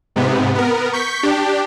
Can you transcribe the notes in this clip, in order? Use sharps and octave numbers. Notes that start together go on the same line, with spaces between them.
G#2 C3 B3
B3 A#4
C#6 G6 B6
D4 G4